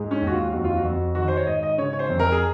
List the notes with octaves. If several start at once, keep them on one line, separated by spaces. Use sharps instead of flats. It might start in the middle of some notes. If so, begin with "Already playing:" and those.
Already playing: G#2 G#3
C#4
D#2
F#4
F4
F2 F#4
F4
F#4
F2
D#3 F#4
C5
C#5
G#2 D#5
D#5
C#3 C#5
C#5
C5
F2
A#4
G#4